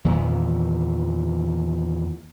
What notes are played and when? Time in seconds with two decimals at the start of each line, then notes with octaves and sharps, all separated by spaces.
0.05 E2 A#2 D#3 E3